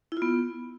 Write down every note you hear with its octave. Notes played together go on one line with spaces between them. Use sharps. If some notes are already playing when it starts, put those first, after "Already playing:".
E4
F4
B3